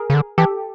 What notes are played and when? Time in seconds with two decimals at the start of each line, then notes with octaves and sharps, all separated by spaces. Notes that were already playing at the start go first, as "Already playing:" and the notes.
Already playing: G#4 A#4
0.10 C#3
0.14 D3
0.38 E3 G4 A4